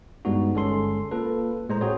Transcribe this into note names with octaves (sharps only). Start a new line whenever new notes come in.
G2 G3 G#3 B3 D#4 F#4
G1 G#3 C#4 A4 C6
A#3 F4 A4 B4
A2 G#3 C5 A#5
C4 F#4 G#4 C5 C#5